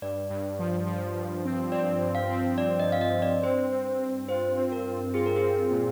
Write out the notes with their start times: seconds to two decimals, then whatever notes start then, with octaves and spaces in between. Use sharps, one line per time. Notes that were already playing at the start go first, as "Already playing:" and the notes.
0.02 G2 D5
0.30 G2
0.59 F3
0.87 F3
1.16 G2
1.45 C4
1.72 C4 D5
2.01 G2
2.15 F5
2.30 C4
2.58 C4 D5
2.80 D#5
2.86 F3
2.92 F5
3.01 D#5
3.15 G2
3.22 D5
3.43 C4 C5
3.72 C4
4.00 C4
4.29 F4 C5
4.57 C4
4.72 A#4
4.86 F4
5.14 F4 G#4
5.26 A#4
5.36 G#4
5.43 C4
5.71 A#2